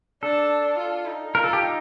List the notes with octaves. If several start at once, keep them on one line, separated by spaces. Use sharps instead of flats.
D4 A4
F4
D#4
F4 A#4
A4
G4
D#4